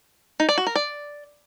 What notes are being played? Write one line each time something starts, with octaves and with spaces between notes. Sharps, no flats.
D#4
D5
F#4
A#4
D5